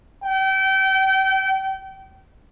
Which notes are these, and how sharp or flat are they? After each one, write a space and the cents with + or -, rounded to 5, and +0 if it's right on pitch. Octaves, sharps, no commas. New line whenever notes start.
G5 -30